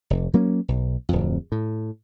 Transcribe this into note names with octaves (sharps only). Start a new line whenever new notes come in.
F1
F#3 A#3 C#4
B1
D1 F2
A2